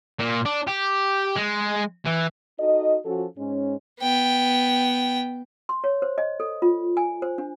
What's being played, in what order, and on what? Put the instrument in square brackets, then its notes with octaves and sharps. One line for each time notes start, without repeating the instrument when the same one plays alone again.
[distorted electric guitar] A#2
D4
G4
G#3
E3
[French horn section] D#4 F#4 A4 D#5
F3 C#4 F#4 A4
G#2 G#3 C#4
[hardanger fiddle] B3 G5
[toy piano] C6
C#5
C5
D#5
A4
F4
G#5
C5
D4